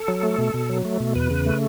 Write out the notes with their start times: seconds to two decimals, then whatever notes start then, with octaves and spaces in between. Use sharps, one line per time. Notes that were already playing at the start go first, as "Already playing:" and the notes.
Already playing: A4
0.08 F#3
0.23 A3
0.38 B2
0.54 B2
0.69 F#3
0.85 A3
1.00 B2
1.16 E2 B4
1.31 C#3
1.46 A3